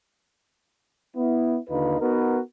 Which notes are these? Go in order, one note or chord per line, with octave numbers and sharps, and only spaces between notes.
B3 E4
D#2 D3 D#4 F4 B4
B3 D#4 F#4 A#4 B4